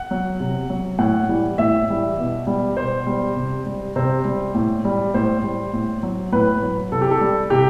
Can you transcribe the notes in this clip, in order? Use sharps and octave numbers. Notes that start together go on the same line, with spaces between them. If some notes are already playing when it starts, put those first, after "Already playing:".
Already playing: F#5
F#3
C3
F#3
A2 F#5
E3 G3
A2 E5
E3 G3
B2
G3
B2 C5
G3
C3
G3
C3 C5
G3
A2
G3
A2 C5
G3
A2
F#3
A2 B4
F#3
C3 A4
G4
A4
G3
C3 G4